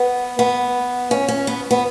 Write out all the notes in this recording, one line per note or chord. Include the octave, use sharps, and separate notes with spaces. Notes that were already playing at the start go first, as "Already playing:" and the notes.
Already playing: B3
B3
C#4
C#4
B3
B3